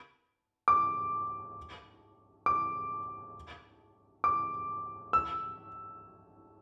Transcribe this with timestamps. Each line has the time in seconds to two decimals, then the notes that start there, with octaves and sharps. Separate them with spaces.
0.68 D6
2.46 D6
4.24 D6
5.13 E6